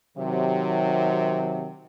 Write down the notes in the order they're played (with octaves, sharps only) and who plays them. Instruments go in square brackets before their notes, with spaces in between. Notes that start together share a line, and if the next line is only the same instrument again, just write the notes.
[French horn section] C3 D#3 F#3